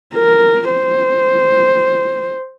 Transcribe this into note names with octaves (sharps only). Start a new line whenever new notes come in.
A#4
C5